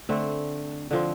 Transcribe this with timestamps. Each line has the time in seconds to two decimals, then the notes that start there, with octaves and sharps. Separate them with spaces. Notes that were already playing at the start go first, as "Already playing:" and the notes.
0.09 D3 A3 C4
0.91 D3 F3 C4